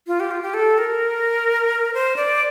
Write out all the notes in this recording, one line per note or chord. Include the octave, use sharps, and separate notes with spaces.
F4
G4
F4
G4
A4
A#4
C5
D5